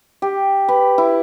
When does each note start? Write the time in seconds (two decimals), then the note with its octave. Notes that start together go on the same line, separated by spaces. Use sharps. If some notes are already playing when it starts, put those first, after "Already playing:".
0.22 G4
0.68 B4
0.98 E4